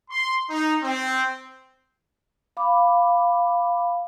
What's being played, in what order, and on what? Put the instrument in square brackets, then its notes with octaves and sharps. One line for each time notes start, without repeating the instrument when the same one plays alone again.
[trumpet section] C6
D#4
C4
[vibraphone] F5 B5 D6